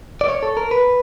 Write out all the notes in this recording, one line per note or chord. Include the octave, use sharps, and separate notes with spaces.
D5
C#5
A4
A#4
B4